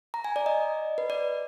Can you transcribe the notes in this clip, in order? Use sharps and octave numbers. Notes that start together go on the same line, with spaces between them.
A#5
G#5
D5
D#5
B4
D5